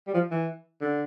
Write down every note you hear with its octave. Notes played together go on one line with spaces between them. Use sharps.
G3
F3
E3
D3